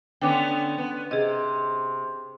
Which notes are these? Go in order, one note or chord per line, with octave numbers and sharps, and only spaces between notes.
D3 B3 C#4 G5 D6
B3
C3 G#4 D#5